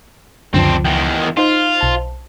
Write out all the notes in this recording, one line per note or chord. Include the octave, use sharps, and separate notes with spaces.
C#2 F#2 D3 F3 C4 D4
E2 D#3 G5
D#4 F4 C5 F5
B1 A5